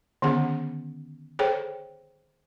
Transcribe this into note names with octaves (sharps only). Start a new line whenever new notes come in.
D3 D#3 B3 C#4 G#4 F#5
G#4 A4 C5 C#5 G5